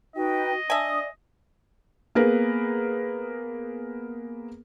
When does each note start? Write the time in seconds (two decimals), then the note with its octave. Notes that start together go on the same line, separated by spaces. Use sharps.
0.16 D#4 F#4 B4 D#5 G5
0.70 D4 D5 E5 G#5 D#6
2.15 A#3 B3 G#4 A#4 B4